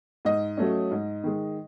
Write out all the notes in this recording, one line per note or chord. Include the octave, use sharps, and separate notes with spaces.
G#2 D#5
F#3 A3 C#4
G#2
D#3 G#3